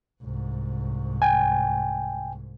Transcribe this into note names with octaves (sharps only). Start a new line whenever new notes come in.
C2 G#2
G5 G#5